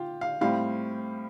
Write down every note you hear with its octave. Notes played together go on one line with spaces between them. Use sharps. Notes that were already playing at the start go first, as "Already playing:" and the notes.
Already playing: F4 G4
F5
A2 G3 C4 F5